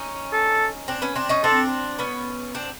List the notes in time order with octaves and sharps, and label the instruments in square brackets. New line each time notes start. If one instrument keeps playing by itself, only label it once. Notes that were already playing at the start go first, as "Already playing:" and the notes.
Already playing: [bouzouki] C#4 D#4
[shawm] A4
[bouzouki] C4 D4
B3 C#4
C4 D4
C#4 D#4
[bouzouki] C4 D4 [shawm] A4
[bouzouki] B3 C#4
C4 D4